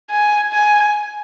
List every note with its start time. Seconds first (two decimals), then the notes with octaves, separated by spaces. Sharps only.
0.10 G#5
0.52 G#5